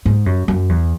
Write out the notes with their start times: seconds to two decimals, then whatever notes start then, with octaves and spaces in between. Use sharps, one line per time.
0.06 G#2
0.26 F#2
0.48 F#2
0.69 E2